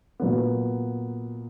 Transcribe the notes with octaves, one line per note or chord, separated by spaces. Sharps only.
A#2 F#3 B3